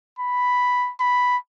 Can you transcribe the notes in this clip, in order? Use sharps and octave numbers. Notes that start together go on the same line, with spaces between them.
B5
B5